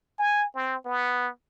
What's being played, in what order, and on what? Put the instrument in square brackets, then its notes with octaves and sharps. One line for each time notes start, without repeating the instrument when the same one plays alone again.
[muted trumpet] G#5
C4
B3